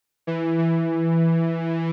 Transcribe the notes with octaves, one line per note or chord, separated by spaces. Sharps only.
E3
E3